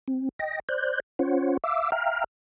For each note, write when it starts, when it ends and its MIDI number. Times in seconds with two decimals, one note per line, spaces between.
0.08 0.29 60
0.39 0.60 75
0.39 0.60 79
0.39 0.60 94
0.69 1.00 72
0.69 1.00 74
0.69 1.00 90
0.69 1.00 91
1.19 1.57 61
1.19 1.57 65
1.19 1.57 72
1.19 1.57 73
1.19 1.57 78
1.64 1.91 76
1.64 1.91 77
1.64 1.91 86
1.64 1.91 88
1.92 2.24 76
1.92 2.24 77
1.92 2.24 79
1.92 2.24 82
1.92 2.24 89